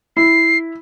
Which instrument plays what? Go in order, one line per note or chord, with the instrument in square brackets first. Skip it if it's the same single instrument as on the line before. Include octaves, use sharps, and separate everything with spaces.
[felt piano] E4 [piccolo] C7